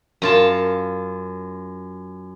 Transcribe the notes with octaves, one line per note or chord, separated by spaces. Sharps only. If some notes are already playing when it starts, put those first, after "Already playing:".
F#2 F4 A5